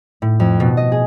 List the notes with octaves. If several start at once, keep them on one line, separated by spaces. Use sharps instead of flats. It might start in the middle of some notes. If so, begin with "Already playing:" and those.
A2
F2
B2
D#5
G#4